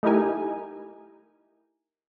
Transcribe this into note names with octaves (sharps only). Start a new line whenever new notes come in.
A3 D#4 E4 G4 A#4 G#5